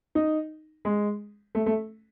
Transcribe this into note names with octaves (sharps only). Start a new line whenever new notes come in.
D#4
G#3
A3
A3